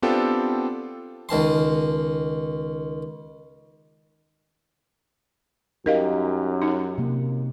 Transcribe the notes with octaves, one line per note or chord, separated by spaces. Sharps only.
B3 C4 D4 F4 G4 A4
C#2 D#3 A5 C6
F#2 D#4 G4 A#4 D#5 F5
D#4
C3 A#3